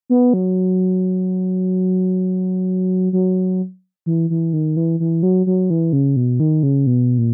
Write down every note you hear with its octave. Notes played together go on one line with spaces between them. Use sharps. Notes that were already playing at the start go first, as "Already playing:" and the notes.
B3
F#3
F#3
E3
E3
D#3
E3
E3
F#3
F#3
E3
C#3
B2
D#3
C#3
B2
A#2